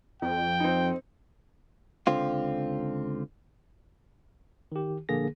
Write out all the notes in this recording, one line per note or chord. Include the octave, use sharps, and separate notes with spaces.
F2 G5
C4 D#4
C#2 D3 C4 F4
D#3 G4
A#1 D3 A#3 G#4 A#6